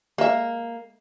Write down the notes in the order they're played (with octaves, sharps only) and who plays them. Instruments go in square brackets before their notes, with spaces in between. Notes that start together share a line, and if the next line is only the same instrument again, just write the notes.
[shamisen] G#3 E5 [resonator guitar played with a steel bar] A#3